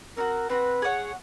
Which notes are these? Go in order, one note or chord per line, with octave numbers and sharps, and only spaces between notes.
C4 D#4 F#4 A#4
C4 D#4 F#4 B4
G#4 C#5 F#5